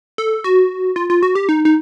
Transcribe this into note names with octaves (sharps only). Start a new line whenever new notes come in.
A4
F#4
F4
F4
F#4
G4
D#4
D#4